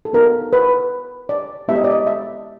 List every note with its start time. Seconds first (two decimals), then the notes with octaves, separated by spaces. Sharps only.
0.05 A4
0.13 B3 D#4 F#4 A#4
0.53 B4
1.29 D5
1.68 G#3 B3 E4 G4 E5
1.76 D#5
1.84 D5
1.91 D#5
2.07 E5